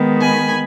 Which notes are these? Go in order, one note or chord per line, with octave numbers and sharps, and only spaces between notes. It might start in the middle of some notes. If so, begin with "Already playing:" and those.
Already playing: D#3 G#3 B3
G#5 B5